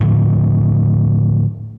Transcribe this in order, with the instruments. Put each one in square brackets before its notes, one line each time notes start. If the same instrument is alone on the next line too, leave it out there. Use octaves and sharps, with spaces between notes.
[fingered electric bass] A2 D3 F3